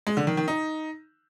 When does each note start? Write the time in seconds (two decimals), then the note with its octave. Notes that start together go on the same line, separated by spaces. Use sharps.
0.07 G#3
0.17 D3
0.27 D#3
0.37 D#3
0.48 D#4